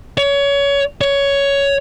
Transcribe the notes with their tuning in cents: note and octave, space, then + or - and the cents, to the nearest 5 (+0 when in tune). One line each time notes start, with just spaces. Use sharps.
C#5 +25
C#5 +10